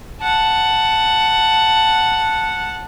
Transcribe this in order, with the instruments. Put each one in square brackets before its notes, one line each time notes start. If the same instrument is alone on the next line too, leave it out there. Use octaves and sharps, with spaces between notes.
[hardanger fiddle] F#5 A5